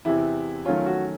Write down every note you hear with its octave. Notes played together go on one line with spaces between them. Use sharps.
E2 C3 E3 E4
D#3 F#3 A3 C#4 F4
F#4